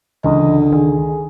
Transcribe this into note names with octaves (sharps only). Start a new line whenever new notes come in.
C#2 D3 E3 D#5
D#3 G#4